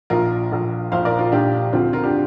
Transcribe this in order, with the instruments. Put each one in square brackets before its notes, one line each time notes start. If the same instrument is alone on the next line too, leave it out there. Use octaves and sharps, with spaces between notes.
[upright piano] A#1 A#2 F3 F4 A#4
A#1 A#2 F3
A#1 A#2 F3 C5 F5
A#4 D5
F4 A#4
A#1 A#2 F3 D4 G4
D2 D3 F3 C4 F4
F4 A#4
D4 G4